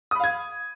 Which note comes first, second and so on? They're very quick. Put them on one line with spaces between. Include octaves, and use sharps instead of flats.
D#6 B5 F5 G#6